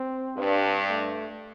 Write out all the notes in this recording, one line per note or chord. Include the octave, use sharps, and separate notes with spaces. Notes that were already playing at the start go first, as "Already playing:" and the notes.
Already playing: C4
G2
A3